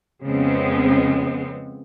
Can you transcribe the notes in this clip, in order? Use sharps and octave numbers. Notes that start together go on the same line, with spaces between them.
F2 C#3 G#3 B3 C4